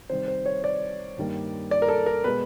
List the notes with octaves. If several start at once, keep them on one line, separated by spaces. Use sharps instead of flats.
C3 D#3 G3 C5
C5
C#5
D5
G2 D#3 G3 A#3
D5
A#4
A4
A#4
B2 G#3 B4